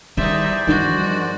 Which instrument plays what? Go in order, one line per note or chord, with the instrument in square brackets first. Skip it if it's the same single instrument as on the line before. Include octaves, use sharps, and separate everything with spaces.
[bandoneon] E2 C5 D5 [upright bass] D#3 G3 [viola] D#4 E5
[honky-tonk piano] G2 D#3 [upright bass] F3 [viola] F#4